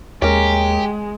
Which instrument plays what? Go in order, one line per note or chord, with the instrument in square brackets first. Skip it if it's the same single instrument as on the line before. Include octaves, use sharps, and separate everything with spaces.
[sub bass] D#2 [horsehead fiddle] G#3 [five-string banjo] C#4 A#4 [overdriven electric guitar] G4